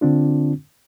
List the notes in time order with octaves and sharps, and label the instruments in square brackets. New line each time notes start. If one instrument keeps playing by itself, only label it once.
[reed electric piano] D3 C4 D4 F4